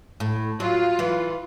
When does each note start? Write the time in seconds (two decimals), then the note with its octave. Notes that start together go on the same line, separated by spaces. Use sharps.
0.20 A2
0.60 F#3 F4
0.99 E3